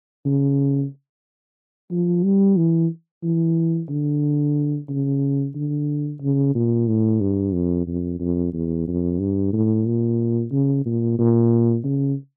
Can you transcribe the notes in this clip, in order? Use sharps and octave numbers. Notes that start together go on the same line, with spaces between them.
C#3
F3
G3
E3
E3
D3
C#3
D3
C#3
A#2
A2
G2
F2
F2
F2
E2
F2
G2
A2
A#2
C#3
A#2
A#2
C#3